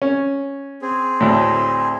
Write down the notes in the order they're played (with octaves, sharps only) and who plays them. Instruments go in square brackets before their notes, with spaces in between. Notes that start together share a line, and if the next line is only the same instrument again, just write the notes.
[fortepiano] C#4
[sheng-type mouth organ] C4 G#4
[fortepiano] D2 A2